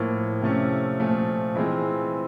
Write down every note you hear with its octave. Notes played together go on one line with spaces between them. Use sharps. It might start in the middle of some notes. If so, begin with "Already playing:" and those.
Already playing: A2 F3 A#3
C3 F3 A3 C#4
A#2 F3 A3
E3 G#3 C4 F4